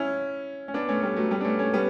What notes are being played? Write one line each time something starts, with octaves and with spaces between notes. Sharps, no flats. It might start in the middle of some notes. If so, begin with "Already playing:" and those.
Already playing: C#4 E4
C#4
B3 D4
A3 C#4
G3 B3
F#3 A3
G3 B3
D4
A3 C#4
A3 C#4
G3 B3